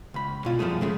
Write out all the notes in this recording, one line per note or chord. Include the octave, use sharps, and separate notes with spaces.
C#2 B5
B2 F4
F#2 F3 G3 A3 G#4
C#3 G#3 A3